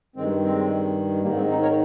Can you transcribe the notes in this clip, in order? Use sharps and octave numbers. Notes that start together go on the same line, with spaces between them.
G2 D#3 G#3 C4
G#3 C4
G#2 D#3 G3 A#3
G#3 C4
C4 D#4
A#4 C#5